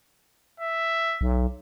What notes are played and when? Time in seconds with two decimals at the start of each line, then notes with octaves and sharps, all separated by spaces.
0.60 E5
1.21 B1